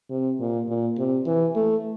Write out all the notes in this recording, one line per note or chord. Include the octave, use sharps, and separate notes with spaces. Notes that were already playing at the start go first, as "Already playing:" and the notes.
C3
A#2
A#2
C3
E3
A3